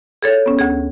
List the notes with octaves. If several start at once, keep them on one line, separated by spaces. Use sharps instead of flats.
G#4 A4 C#5 A6
B3 C#4
D2 G#4